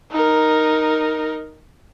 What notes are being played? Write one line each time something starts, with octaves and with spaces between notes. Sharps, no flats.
D#4 A#4